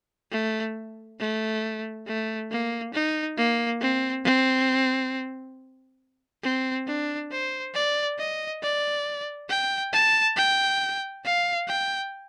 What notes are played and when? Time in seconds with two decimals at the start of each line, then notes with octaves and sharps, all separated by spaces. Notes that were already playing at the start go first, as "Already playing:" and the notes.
0.31 A3
1.20 A3
2.07 A3
2.51 A#3
2.94 D#4
3.38 A#3
3.81 C4
4.25 C4
6.43 C4
6.87 D4
7.31 C5
7.74 D5
8.18 D#5
8.62 D5
9.49 G5
9.93 A5
10.37 G5
11.24 F5
11.68 G5